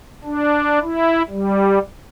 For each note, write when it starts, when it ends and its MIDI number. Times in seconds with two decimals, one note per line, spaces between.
0.24 0.79 62
0.83 1.23 64
1.29 1.79 55